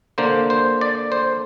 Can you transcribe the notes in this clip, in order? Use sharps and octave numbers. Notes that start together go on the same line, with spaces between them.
D3 A#3 C5
C5
D5
C5